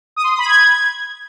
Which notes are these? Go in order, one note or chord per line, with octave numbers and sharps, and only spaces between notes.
D#6
C6
D#6
B5
G#6